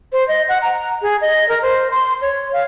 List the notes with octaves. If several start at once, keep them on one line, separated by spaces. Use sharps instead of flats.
C5
D#5
F#5
A#5
G#4
D#5
A#4
C5
C6
C#5
F5